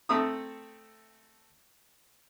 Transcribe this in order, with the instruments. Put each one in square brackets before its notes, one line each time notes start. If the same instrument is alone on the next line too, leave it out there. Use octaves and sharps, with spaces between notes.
[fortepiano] A3 C4 A4 E5 A#5 D#6